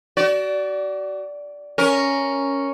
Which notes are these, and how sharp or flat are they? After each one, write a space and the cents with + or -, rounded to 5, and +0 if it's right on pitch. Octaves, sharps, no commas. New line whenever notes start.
F#4 +35 D5 -10
C#4 +0 A#4 +0